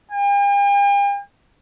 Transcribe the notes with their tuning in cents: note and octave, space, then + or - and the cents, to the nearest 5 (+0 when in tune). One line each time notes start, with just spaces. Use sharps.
G5 +45